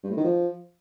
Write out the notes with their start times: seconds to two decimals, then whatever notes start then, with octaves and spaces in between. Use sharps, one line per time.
0.03 G2
0.10 A2
0.17 D#3
0.24 F3